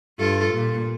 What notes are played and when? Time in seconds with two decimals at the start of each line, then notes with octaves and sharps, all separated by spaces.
0.19 G2 F4 A4
0.53 A#2